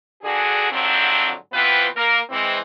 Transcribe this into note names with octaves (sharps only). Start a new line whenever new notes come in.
G2 D3 F#4 G#4
G#2 D3 F3 F#3 C4
C3 E3 B3 C4 F4 B4
A#3 A#4
E3 G#3 C4